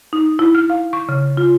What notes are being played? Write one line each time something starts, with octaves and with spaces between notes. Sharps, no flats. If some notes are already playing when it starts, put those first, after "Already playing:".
D#4
E4
F6
F5
C#6
C#3
F4